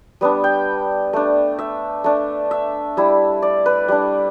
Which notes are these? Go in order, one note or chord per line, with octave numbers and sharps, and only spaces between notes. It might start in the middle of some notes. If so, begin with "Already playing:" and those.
G3 B3 D4
G5
A3 D4
E5
A3 D4
E5
G3 E4
D5
B4
G3 D4